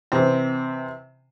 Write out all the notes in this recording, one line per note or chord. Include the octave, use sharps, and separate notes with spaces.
C3 E3 C4